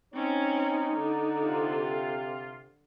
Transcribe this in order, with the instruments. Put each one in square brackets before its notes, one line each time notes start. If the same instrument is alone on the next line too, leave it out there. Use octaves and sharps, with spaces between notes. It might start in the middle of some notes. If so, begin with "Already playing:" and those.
[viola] C4 C#4 [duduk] D#4 [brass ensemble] C#5
[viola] D3
[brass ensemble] C3 F4